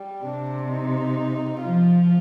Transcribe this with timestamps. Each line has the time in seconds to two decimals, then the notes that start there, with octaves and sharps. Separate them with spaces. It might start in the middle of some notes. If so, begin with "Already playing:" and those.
Already playing: G3
0.25 C3 D4
0.71 D#4
1.62 F3 F4